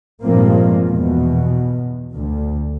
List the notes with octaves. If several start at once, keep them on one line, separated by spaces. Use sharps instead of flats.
G2 A#2 F3 G#3 A#3 C4
E2 B2
D2